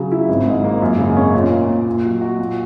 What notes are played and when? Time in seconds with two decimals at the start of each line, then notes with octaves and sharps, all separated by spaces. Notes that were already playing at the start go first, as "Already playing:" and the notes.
Already playing: C#3 F#3
0.12 E4
0.28 G#1
0.46 G#2
0.64 A#3
0.82 F#2
0.99 C#3
1.17 C#4
1.34 A#2
1.51 A#3
1.69 A#2
1.86 A#2
2.05 F#3
2.21 F#4
2.39 A#2